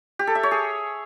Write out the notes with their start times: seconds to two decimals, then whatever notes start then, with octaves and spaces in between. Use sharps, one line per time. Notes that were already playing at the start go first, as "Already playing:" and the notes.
0.19 G4
0.27 A4
0.35 E5
0.43 C#5
0.51 G#4